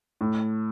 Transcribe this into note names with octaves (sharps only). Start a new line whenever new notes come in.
A2